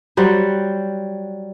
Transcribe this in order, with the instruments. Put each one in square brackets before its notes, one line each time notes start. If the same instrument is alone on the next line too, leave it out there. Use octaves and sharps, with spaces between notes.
[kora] F#3 G3 C5 F#5